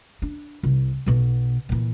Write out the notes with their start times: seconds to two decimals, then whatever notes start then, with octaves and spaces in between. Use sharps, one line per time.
0.22 D4
0.63 C2
1.06 B1 B2
1.69 A#2 E3